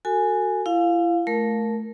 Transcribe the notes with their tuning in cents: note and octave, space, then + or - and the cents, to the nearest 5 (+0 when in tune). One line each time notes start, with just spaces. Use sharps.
F#4 +0 A4 +35 G#5 +0
E4 +35 F5 +10
A3 -15 A#4 +0